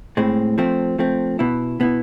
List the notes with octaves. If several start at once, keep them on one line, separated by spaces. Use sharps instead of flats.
A2 G#3 C4
F3 A3 C4
F3 A3 C4
B2 B3 E4
B2 B3 E4